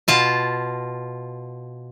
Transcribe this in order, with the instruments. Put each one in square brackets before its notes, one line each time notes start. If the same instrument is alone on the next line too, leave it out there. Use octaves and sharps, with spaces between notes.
[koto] B2 F4 A5